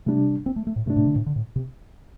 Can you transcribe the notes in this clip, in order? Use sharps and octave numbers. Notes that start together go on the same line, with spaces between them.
C3 G3 A3 D4
C4
A3
A3
A2
G2 C3 A3 D4
A2
D3
A2
D3
A2
C3